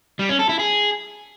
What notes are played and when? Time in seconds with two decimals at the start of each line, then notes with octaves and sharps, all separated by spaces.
0.19 G3
0.29 C#4
0.39 A4
0.49 E4
0.59 G#4